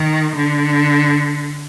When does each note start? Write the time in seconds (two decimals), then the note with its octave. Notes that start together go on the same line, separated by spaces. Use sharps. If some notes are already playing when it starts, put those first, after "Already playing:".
Already playing: D#3
0.36 D3